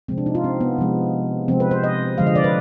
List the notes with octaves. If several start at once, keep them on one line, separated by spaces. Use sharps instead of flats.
C3 F3 G#3 C4
D4
D#4
F4
C4
B3
C3 F3 G#3
C3 F3 G#3 C4
B4
C5
D#5
D3 F3 G#3 F5
D#5
D5
B4